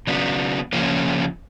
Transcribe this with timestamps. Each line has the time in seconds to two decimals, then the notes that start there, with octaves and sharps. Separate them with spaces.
0.07 C#3 F#3 B3 D4
0.73 C#3 F3 A#3 C#4